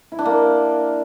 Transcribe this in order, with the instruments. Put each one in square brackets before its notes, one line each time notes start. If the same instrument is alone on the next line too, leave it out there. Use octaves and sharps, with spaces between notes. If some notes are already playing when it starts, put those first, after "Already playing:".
[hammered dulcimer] E4
D4
A#3